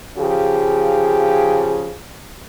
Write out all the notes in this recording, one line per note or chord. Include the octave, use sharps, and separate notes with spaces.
C#3 F3 G4 G#4